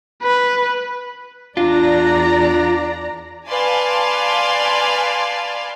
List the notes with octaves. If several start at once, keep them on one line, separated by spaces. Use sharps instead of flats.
B4
E2 D4 F4 D5 A#5
B4 D5 F5 G#5 A5 C6